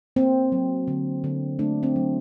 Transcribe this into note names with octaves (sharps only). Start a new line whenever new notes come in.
A#3 C4
F#3
D3
D3
A3 D4
C4
F#3